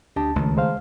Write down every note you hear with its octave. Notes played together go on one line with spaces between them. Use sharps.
D2 D4 G4 D#5 A5
C#2 D#3 A3
G#3 C5 F5